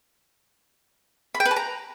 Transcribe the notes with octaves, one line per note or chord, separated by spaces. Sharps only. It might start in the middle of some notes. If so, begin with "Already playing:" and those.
B5
G5
B4
A5
A#5